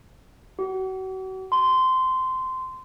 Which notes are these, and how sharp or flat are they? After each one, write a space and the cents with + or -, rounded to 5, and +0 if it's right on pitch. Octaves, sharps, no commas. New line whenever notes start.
F#4 +35
C6 -15